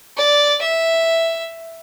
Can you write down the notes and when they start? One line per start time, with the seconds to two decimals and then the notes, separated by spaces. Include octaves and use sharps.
0.17 D5
0.61 E5